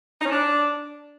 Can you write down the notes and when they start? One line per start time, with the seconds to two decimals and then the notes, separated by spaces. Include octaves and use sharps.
0.20 D#4
0.26 C#4
0.31 D4